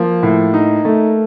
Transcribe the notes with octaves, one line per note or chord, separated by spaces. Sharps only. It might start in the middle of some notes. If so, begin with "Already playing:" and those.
Already playing: F3 A#3
A2
D#4
A3